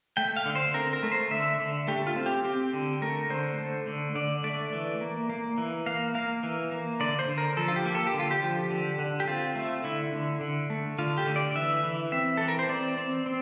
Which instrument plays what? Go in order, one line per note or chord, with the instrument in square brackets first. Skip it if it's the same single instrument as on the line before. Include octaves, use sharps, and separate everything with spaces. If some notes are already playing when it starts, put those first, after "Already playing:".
[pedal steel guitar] A3 G5
F5
D3
C5
C4 A#4
A#4
A3
C5
D3 E5
D3
A3 G4
F4
C4
G4
C4 G4
D3
A3 A#4
D3 C5
A3
D3
D3 D5
A3 D5
E3
A#3
A#3
E3
A#3 F5
A#3 F5
E3
A#3
D3 D5
C5
D3
A#4
F3 A4
F4
G4
A#3
A4
G4
D3
F4
G4
F3
D3
D3
G4
C4 F4
A3
D3 E4
D3
D3
A3
D3 F4
G4
D3
D5
E3 E5
E3
C4 E5
E3 A4
A#4
C5
C4 D5
C4
C4